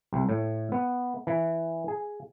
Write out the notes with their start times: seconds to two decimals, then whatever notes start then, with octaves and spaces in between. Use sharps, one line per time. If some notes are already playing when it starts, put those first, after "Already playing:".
0.13 C2
0.29 A2
0.72 B3
1.27 E3
1.88 G#4